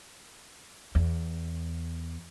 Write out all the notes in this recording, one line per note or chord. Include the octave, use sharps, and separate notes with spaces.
E2